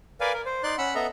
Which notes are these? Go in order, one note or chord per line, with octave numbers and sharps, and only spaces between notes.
A#4 B4 D5 F5 G#5
A#4
C5
D#4 D5 C6 F#6
C#4 F#5 B5 E6 F#6
B3 A4 D#5 E5 A#5